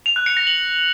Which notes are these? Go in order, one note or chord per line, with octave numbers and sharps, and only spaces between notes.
F7
F#6
C#7
A#6
F#7